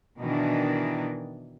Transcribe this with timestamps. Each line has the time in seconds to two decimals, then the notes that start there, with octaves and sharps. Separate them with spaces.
0.19 B2 D#3 E3 D4